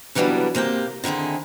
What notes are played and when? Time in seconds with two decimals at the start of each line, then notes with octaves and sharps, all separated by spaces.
0.15 C#3 E3 F#3 G3 B3 D4
0.55 C3 A#3 G4 G5
1.04 D3 D#3 C4 E4 G#4